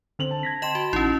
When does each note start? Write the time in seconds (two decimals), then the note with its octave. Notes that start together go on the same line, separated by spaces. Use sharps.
0.19 D3 C4 F7 F#7
0.31 A5
0.43 G#6 A#6 B6
0.62 D#5 G5 A5 C6 E7
0.75 F#4
0.93 A1 C#4 D#4 E4